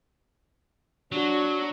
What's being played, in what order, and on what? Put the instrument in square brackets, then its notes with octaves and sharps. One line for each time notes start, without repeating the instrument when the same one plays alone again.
[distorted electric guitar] F#3 [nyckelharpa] D4 F#4